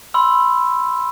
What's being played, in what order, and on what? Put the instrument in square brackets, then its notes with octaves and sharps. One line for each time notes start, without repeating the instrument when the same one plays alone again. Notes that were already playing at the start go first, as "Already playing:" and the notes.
[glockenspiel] B5 C6 E6